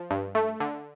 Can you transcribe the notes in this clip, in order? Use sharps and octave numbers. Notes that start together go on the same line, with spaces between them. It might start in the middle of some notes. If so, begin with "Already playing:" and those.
Already playing: F3
G2
A3
D3